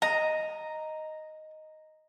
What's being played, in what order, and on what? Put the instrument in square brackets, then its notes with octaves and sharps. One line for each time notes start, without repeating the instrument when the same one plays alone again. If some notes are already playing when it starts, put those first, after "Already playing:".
[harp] D#5 [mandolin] A#5